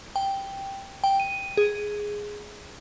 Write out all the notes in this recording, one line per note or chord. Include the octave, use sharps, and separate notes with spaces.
G5
G5
D#7
G#4